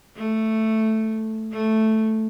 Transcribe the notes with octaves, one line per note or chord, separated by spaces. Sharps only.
A3
A3